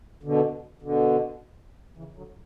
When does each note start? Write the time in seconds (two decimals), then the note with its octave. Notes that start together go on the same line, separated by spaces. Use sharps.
0.23 B2 D3
0.82 B2 D3
1.97 C#3 E3
2.16 D3 F#3